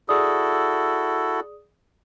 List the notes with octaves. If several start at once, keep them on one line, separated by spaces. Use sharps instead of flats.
E4 F#4 G#4 A4 D5 D#6